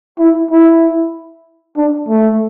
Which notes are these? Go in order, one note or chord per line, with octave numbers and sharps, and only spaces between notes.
E4
E4
D4
A3